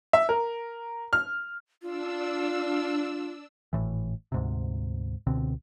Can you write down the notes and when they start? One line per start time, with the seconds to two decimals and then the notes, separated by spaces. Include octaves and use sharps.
0.13 E5
0.29 A#4
1.13 F6
1.82 D4 F4 E6
3.73 G#1 C#2 A2 E3
4.32 D2 G#2 C3
5.27 C#2 B2 D3 C4